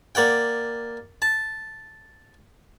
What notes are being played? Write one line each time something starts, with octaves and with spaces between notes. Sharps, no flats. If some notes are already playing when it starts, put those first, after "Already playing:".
A#3 D5 F#5 G5
A5